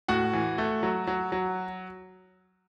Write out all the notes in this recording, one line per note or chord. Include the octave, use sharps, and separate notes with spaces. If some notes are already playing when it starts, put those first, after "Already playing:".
A2 F#4 F#5
E3
A3
F#3
F#3
F#3